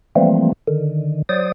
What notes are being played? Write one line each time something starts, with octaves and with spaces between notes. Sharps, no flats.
E3 F3 G3 A3 A#3 C4
D3 D#3
F#3 C5 D5 D#6